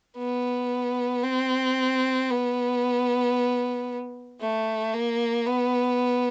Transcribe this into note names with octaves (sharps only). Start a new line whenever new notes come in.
B3
C4
B3
A3
A#3
B3